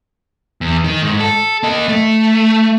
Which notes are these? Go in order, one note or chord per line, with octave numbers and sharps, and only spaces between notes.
E2
D#3
G#2
A4
A#3 D#5
A3